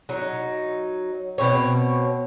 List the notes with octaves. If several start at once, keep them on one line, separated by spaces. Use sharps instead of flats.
F#3 D#4
B2 C4 C#5